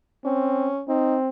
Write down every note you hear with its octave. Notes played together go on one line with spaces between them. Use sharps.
C4 C#4
C4 D#4